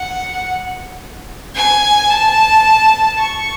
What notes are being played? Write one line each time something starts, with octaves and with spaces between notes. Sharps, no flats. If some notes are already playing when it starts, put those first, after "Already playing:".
Already playing: F#5
G#5
A5
C#6